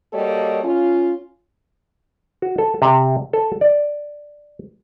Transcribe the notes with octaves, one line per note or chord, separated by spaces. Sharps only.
G3 A#3 F#4 A4 C#5 D#5
C#4 F4
F#4
A4
C3
A4
D5